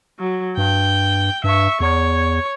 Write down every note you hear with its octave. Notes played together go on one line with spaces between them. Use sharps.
F#3
G2 G5
G2 E5 C#6
E2 C#5